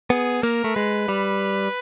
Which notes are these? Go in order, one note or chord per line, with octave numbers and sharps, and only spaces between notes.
B3 G#4
A#3 A#4
A3
G#3 B4
G3